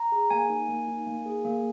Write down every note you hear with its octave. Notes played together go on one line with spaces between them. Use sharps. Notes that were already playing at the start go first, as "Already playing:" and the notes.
Already playing: A#5
G#4
A#3 G#5
D#4
A#3
D#4
A#3
G#4
A#3